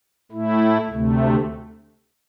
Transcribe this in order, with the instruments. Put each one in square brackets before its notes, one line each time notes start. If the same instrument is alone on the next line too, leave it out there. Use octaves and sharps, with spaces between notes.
[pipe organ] A2 A3 E4
D2 C3 A3